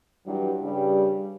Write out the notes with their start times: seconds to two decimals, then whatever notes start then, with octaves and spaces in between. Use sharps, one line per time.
0.26 G2 E3 F#3 G3
0.62 G2 C#3 G3